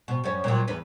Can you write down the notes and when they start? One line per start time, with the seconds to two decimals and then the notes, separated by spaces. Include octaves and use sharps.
0.08 B2
0.24 F#2 C#4
0.44 A#2 F#3
0.68 E2 B4